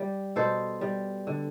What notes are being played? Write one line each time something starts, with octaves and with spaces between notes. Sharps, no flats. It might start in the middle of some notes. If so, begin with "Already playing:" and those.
Already playing: G3
B2 A4 C5
G3
D3